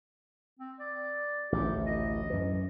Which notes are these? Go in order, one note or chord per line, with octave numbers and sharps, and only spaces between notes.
C4
D5
A1 D2 A2 G4
D#5
F#2 E3